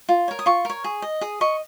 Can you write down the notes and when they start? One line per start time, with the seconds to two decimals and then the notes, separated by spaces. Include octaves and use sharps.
0.09 F4
0.28 A#4 C#5
0.39 D#6
0.46 F4 C#6
0.65 A#4 C#5
0.84 G#4
1.02 D#5
1.21 G#4 D#6
1.41 D#5 C#6